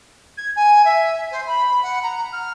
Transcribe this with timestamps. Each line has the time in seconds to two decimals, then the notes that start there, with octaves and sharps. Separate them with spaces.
0.37 G#6
0.56 G#5
0.85 E5
1.31 C5
1.46 B5
1.82 F#5
2.03 A#5
2.32 F6